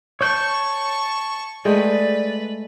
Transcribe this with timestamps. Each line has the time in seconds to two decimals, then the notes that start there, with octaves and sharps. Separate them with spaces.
0.21 C#5 A5 C#6 G6
1.65 G#3 A3 B4 D5 G5